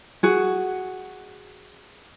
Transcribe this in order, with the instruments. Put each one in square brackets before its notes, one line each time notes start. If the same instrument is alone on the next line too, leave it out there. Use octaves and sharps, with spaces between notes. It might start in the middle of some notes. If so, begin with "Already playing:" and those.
[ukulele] F#4 G#4